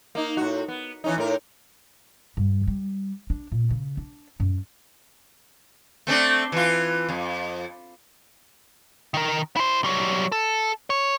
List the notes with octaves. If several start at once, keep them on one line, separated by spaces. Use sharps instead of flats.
A#3 D#4
A2 F#4
B3
E3 C#4 D#4
A2 A#4
G2
G3
D4
A#2
C#3
D4
F#2
A3 C4 D4
E3 F4
F2
D#3 A#4
E4 C5
F#3 G3
A4
C#5